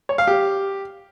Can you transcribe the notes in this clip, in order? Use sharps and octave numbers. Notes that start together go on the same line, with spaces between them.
C#5
F5
G4